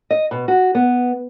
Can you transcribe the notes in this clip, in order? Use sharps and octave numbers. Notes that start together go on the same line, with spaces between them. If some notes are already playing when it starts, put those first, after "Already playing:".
D#5
B2
F#4
B3